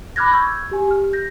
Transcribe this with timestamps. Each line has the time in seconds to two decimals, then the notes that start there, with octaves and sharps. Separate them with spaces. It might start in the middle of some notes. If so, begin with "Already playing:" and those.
0.16 B5 D6 F6 F#6 G#6 A#6
0.33 C#6 E6 F6 G6 G#6
0.71 G4 G#5
0.88 G4 F6
1.13 G6 A#6